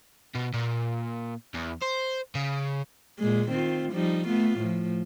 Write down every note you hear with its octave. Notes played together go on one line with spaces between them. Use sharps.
B2
A#2
E2
C5
C#3
A#2 G#3
D#3 C4 F4
F3 G3 D#4
A3 B3 F4
A2 F3